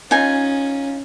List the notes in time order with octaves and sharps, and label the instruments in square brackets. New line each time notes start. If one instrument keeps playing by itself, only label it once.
[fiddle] C#4 [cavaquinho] D#4 F4 G#5